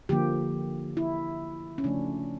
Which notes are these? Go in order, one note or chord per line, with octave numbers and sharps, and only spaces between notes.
D3 F3 A#3 G4
E4
C#4
C#3 F3 A3 D4